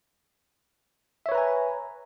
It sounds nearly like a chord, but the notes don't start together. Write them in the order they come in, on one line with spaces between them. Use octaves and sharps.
E5 C#5 B4 A#5 G#5